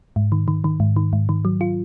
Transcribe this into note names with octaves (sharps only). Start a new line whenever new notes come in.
G#2
D#3
D#3
D#3
G#2
D#3
G#2
D#3
F#3
F4